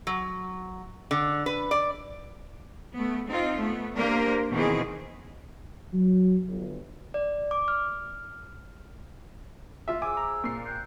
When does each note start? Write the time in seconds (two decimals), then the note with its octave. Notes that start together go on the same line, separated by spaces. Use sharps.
0.07 F#3
1.11 D3
1.46 B4
1.71 D5
2.94 A3 B3
3.28 C4 D#4 F4
3.60 A3 B3
3.96 A#3 D4 G4 A#4 C5
4.52 B2 D#3 E3 C4 G#4
5.92 F#3
6.48 G1
7.14 D5
7.51 D6
7.68 F6
9.88 F4 E5
10.02 G#4 C5 G#5 D6 E6
10.17 A#5
10.44 A#2 C7
10.63 G5 F#6 G6